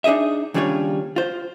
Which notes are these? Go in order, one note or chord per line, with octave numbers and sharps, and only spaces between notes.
D4 D#4 G#4 D#5 E5
D#2 C#3 G3 D4 F4 C#5
F4 C5